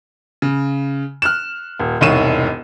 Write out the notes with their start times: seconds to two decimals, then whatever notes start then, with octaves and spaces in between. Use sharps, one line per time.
0.42 C#3
1.22 F6 F#6 E7
1.79 D#1
2.01 E1 C2 G#2 C#5 D#7 E7